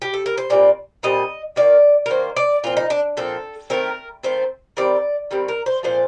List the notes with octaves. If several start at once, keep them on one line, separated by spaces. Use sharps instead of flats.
G4
A4
A#4
C5
A#2 G3 C4 D5
A#2 G3 C4 D#5
D#3 A#3 D5
A#4
D#3 A#3 C5
D5
A#2 F3 C4 F4
D#4
D4
A#2 F3 C4 A4
D#3 A3 C4 A#4
D#3 A3 C4 C5
D#3 G3 C4 D5
D#3 G3 C4
A#4
C5
A#2 F3 A3 C4 C5